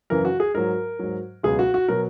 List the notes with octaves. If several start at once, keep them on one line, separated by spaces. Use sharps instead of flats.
F#2 C#3 E3 A#4
F#4
G#4
G#2 F#3 A#4
G#2 F#3
C#2 B2 F#3 G#4
F#4
F#4
B2 F#3 A#4